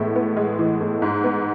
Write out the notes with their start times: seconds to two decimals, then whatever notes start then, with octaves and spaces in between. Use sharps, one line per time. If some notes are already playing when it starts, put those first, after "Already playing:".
Already playing: A2 E3 G#3 B3 E5
0.16 B3
0.37 G#3
0.59 E3
0.81 A2
1.02 G#2
1.24 B3